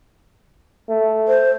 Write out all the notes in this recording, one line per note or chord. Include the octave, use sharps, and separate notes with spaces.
A3
C5